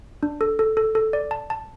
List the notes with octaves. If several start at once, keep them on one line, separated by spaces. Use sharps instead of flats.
D4
A4
A4
A4
A4
D5
A5
A5